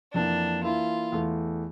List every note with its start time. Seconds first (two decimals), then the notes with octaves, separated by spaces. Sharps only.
0.13 F2 E3 A#3 D4
0.63 E3 A#3 E4 F4
1.12 E2 E3 A3